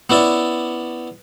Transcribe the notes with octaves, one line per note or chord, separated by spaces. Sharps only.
B3 C#4 E4 D5